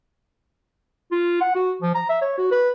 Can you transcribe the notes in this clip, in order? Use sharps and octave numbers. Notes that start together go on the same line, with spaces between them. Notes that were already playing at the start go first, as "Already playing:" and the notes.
F4
F#5
F#4
F3
A#5
E5
C#5
F#4
B4